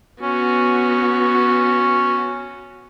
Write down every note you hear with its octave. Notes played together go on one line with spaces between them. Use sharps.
B3 C#4 F#4